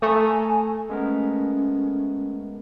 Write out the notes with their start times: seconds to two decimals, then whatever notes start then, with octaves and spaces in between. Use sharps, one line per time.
0.02 A3 A4 G#5 A#5 D#6
0.90 G#3 B3 C#4 A#4